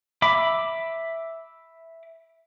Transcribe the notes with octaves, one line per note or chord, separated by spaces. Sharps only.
E5 B5 D6